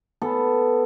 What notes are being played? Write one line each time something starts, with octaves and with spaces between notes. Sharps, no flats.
B3 A4